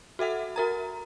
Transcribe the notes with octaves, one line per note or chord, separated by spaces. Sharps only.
F#4 A4 E5 F#5
F#4 A#4 A#5